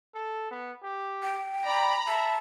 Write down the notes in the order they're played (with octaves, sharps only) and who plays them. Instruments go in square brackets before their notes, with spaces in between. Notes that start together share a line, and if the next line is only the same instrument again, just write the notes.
[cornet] A4
B3
G4
[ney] G5
[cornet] D5 [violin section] A#5 B5
[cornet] E5 [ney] A5